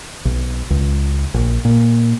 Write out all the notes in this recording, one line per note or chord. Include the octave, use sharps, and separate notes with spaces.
B1
C#2
A#1
A#2